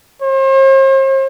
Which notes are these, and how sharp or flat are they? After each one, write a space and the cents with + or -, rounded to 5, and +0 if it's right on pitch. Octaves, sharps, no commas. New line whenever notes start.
C5 +45